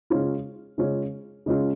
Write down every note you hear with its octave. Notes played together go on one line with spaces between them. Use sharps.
C#3 G#3 C#4 F4
C#3 G#3 C#4 F4
C#3 G#3 C#4 F4